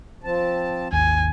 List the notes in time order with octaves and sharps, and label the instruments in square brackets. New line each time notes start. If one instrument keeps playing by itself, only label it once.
[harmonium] F3 C4 A5
[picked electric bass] G#1 D#2 [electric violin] G#5